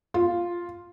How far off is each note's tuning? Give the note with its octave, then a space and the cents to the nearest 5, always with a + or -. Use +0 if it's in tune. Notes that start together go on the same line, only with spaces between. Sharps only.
F4 +0